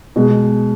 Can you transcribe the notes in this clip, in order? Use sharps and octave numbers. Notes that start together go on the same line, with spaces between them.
B2 G#3